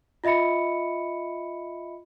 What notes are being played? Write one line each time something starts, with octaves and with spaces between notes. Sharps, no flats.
F4 D#5 E5 B5 C#7